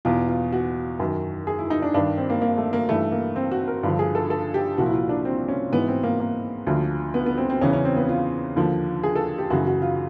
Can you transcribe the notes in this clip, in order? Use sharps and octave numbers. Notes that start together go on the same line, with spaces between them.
E2 B2 F4
F4
F#4
F#2 D#3
G#4
E4
D#4
D4
G2 D#3 D4
C4
A#3
A#3
A3
A#3
G2 E3 A3
A#3
C4
F#4
A#4
G2 D3 F3
G#4
A4
A4
G4
C2 A#2 F3 F#4
E4
F4
D4
C4
C#4
G#2 E3 B3
C4
A#3
A#3
D2 D3 F3
B3
B3
C4
C4
E2 C#3 E3 C#4
C#4
C4
B3
F4
D#2 D3 F3
G#4
A4
G4
F#2 C#3 E3 F#4
F#4
F4